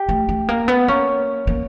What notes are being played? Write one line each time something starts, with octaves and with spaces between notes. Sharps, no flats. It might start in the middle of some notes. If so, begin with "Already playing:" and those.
Already playing: G4
A3
A3
A#3
B3
A#3 C#4
A#3